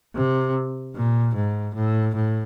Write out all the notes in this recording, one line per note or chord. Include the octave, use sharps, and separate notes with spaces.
C3
A#2
G#2
A2
A2